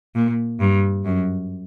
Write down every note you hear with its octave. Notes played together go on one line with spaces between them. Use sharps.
A#2
G2
F#2